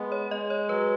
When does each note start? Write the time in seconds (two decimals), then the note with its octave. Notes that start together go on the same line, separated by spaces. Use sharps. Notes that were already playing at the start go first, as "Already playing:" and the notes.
Already playing: G#3 B3
0.12 C#5
0.30 G#3 D#5
0.50 C#5
0.69 F#3 B4